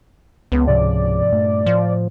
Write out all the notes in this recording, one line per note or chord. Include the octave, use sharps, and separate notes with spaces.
C#2 B3
G#2 C3 F3 D5
G2 A#2 A3
A2 F3